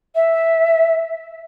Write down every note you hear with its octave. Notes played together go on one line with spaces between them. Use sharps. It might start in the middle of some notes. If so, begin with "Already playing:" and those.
E5